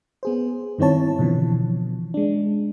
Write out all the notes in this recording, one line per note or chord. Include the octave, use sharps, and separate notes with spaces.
B3 G#4 C5
G2 D#3 C4 E4 C#5 A5
B2 D3 E3 F3
G#3 D4